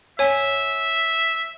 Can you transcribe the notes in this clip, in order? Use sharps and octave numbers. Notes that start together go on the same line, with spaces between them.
C#5 E5 G#5